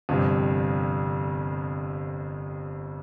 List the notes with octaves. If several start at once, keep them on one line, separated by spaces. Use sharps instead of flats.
G1 F2 C3 G3